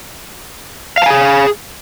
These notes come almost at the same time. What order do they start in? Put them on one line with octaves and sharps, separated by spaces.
F5 A5 G#5 G#4